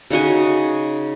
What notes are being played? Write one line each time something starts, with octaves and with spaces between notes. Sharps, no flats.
C#3 D#4 F#4 G#5